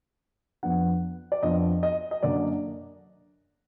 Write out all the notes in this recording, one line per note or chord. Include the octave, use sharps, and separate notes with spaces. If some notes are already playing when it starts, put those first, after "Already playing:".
F2 F3 B3 D4 F#5
D5
F2 F3 B3 D4 D#5
D#5
D#5
F#2 D3 F#3 A#3 D5